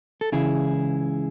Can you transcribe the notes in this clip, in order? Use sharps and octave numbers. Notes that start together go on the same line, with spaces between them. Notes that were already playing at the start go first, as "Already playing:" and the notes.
A4
C#2 C#3 E3 E4 G#4